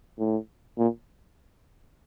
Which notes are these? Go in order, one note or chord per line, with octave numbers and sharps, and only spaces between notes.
A2
A#2